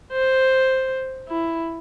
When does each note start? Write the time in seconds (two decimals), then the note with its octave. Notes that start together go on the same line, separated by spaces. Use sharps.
0.13 C5
1.29 E4